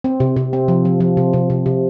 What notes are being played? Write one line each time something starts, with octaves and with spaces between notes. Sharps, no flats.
C4
C3
C3
C4
F3
F3
F3
C3
C3
C3
C3